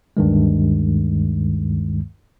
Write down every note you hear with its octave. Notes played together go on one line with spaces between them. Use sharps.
D2 G2 D#3 G#3